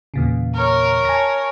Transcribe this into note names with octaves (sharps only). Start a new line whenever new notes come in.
E2 A#2 C#3
A#4 C#5
G#5 A5 A#6